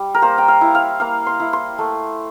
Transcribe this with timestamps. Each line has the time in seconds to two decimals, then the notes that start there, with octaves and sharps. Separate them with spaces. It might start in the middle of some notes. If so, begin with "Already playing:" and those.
Already playing: G3
0.14 A#4
0.22 A#3 C5
0.38 G5
0.48 F5
0.61 E4
0.75 F5
1.00 A#3 F5
1.26 C6
1.40 E4
1.53 C6
1.78 A3